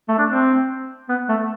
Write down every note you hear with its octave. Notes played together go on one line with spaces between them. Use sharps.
A3
D4
C4
B3
A3